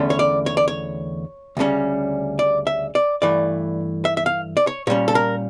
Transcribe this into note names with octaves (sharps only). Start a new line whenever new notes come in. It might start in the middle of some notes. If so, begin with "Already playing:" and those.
Already playing: E2 D3 A3 C#4
C#5
D5
C#5
D5
C#5
D2 C#3 G3 C#4
D5
E5
D5
G2 E3 A3 D5
E5
E5
F5
D5
C#5
A#2 G3 C#4 C#5
A4
A#4